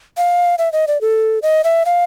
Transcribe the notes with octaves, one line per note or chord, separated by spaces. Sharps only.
F5
E5
D#5
D5
A4
D#5
E5
F5